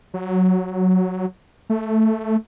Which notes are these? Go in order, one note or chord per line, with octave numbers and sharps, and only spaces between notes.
F#3
A3